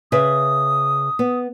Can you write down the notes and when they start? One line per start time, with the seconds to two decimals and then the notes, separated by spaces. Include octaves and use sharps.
0.12 C#3 B4 E5 D#6
1.19 B3